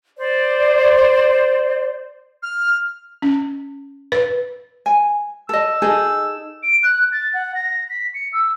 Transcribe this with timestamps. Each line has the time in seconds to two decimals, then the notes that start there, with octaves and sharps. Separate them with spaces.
0.18 C5 D5
2.43 F6
3.22 C#4
4.12 B4
4.86 G#5
5.49 A4 D#5 E6
5.82 D#4 G#4 A4
6.63 D7
6.83 F#6
7.12 A6
7.34 F#5
7.55 A#6
7.90 B6
8.14 C#7
8.33 E6